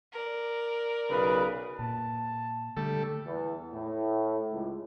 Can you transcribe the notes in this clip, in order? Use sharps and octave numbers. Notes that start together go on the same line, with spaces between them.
A#4 D5
B1 C#3 B4
A#2 A5
D3 G3 A3 A4
E2
A2
C#2